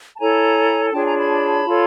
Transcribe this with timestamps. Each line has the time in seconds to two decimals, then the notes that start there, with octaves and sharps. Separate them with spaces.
0.14 A5
0.20 E4 A4 C#5 G#5 A#5
0.86 G#5
0.92 D4 F4 G#4 C#5 G5 A5
1.05 G#5 A#5
1.16 A5 B5
1.65 F4 A4 C#5